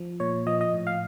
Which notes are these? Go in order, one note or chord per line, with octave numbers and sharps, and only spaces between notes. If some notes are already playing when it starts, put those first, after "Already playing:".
Already playing: F3
A#2 C#5
F3 D#5
D#5
A2
F5